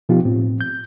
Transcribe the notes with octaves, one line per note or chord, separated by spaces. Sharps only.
B2 F3 B3 D#4 F4 G4
A2 C4
G6